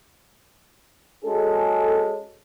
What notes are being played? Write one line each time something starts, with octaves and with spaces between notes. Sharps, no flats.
G#3 C#4 F#4 G#4 A4